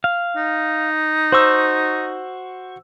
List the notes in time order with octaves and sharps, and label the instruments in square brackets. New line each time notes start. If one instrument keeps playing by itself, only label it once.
[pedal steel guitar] F5
[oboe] D#4
[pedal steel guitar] F#4 C#6 [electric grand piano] C5 E6